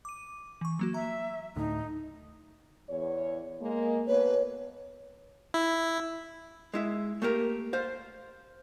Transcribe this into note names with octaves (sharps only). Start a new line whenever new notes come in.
D6 D#7
E3 C#6
F#3 A#3 F#4
E5 A#5
D2 A2 D#4
E2 C#5
G#3 A#3
B2 A#3 B3 B4 C#5
E4
G#3 E4 E5
A3 A#3 G4 A#4
C5 F5